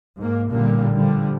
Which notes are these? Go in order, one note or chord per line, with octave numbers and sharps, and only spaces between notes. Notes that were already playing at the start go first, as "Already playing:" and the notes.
G#2 A#3
A1 A#2 D3 G3 A#3
D3 F3 G3